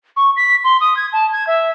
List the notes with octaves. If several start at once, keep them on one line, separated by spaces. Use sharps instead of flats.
C#6
B6
C6
D#6
G#6
A5
G#6
E5